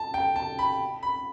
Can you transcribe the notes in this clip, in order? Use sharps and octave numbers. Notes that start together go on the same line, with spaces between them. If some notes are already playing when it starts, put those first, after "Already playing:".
Already playing: A5
G5
A5
B5
B5